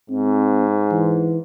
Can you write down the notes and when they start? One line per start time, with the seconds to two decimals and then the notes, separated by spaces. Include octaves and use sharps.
0.10 G#2 C4
0.91 E3